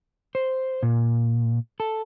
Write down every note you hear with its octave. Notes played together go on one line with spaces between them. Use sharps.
C5
A#2
A4